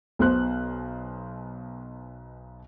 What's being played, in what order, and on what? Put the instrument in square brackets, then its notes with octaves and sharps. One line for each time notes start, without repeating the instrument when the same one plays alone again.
[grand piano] B1 B2 C5 F#6